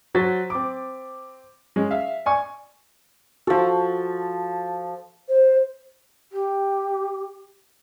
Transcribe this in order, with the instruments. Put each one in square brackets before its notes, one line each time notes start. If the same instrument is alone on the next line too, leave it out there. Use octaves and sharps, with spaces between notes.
[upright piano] F#3 F#4 C5 A6 B6
C4 D6
G#3 C#4
E5 F5
D5 G#5 C#6
[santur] F3 A4 [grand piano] F#4
[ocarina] C5
[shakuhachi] G4